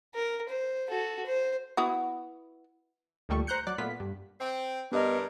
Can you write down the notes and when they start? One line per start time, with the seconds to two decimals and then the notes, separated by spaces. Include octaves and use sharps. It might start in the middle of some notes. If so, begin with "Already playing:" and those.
0.15 A#4
0.49 C5
0.89 F#4 A4
1.26 C5
1.77 B3 E4 F#4
3.29 D2 A#2 D#3 G3 A3 C#6
3.47 C5 A#5 F#6 G6 C#7
3.67 F#3 D5 F#6
3.78 A#2 A3 B3 F4 B6
4.00 G2
4.40 C4
4.92 G2 B3 D4 A#4 D#5